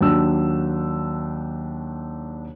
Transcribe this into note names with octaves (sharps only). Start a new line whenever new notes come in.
D#2 F#3 D4 E6